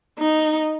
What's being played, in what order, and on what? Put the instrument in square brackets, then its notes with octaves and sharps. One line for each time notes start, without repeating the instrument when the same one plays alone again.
[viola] D#4